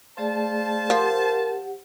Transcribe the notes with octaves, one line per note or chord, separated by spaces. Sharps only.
A3 G#4 C5 D5 F5 A5
F3 G4 A#4 F#5